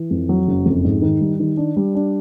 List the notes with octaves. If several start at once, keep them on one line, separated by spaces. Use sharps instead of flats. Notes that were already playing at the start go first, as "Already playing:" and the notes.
Already playing: E3
F2
F#3
F#1
F2
G#2
D#3
G3
D#3
D4
G3
D4